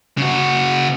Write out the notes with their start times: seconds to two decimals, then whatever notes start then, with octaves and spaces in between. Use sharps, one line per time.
0.18 C#3 F#4